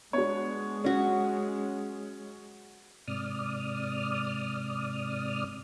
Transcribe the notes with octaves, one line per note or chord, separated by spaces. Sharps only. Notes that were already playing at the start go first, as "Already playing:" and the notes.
G#3 B3 D4 F#4 C#5
F#3 C#4 F#4
G#2 C3 D5 D#6 F6